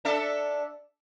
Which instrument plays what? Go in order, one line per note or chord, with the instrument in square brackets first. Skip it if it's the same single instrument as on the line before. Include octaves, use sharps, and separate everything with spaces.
[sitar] D4 A4 E5